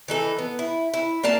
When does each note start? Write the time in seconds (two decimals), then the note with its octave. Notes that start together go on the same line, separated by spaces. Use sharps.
0.08 E3 D#4 A4
0.39 B3
0.59 E4
0.94 E4
1.23 A#3 D5 F5 A5